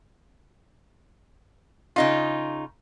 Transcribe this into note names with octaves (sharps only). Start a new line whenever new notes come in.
C#3 D#4 F4